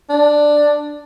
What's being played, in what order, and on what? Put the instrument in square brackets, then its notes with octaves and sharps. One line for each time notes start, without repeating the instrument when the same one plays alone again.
[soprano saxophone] D4